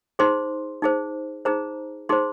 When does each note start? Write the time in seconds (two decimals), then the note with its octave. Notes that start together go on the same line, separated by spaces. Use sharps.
0.19 D#4 G#4 C5 C6
0.82 D#4 G#4 C5
1.45 D#4 G#4 C5 A#5
2.09 D#4 G#4 C5 C6